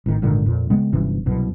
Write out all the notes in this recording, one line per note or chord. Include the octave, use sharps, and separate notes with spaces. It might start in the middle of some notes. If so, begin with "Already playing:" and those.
A1 D#3
G#1 A#2 D3 D#3
F2 A#2
C#3 G#3 B3 C4
G1 F#2 C3 E3
C2 F#2 B2